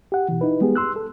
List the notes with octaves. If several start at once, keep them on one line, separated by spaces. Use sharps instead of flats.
G4 F#5
B2 E3
D#4 E4 B4
G3 G#3 B3 G4 G#4
C6 E6 F#6
A4